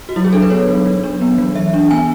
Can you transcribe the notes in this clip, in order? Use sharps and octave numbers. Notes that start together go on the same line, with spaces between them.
F#4
F#3 E4
G#4
D4 A4
B4
B3 C#5
F#3
F#3
D4
B3
F#3
E3 E5
D4
B3 G#5